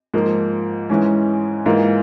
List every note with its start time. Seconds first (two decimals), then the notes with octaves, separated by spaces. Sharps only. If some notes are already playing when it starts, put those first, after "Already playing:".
0.14 G#2 F3 A#3
0.90 G#2 E3 G#3 C#4
1.66 G#2 E3 A#3 F4